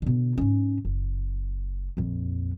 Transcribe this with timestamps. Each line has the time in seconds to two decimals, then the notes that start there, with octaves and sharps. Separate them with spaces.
0.02 B2 D3
0.38 G#2 C#4
0.85 F#1
1.97 A#1 F2